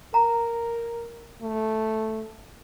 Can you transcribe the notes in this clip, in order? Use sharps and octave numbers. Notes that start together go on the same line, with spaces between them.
A#4 A#5
A3